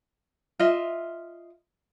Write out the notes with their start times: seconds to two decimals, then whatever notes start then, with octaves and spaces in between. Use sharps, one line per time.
0.59 F4 D#5 E5